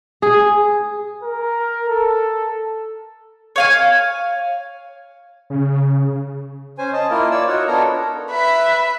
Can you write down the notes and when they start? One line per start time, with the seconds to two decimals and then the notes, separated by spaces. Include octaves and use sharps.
0.22 G#4
1.23 A#4
1.88 A4
3.56 C#5 F5 G#5
5.50 C#3
6.78 C#4 C5 G#5
6.93 D#5 A5
7.10 A#3 E4 F4 A#4
7.31 C#5 D5 E6
7.47 D#4 F4 F#4 C#5 F#5
7.67 B3 D4 A4 A#4 C#5 A#5
8.31 B4 E5